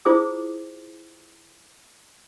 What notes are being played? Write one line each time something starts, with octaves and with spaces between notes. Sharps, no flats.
E4 F4 G#4 C5 D6 D#6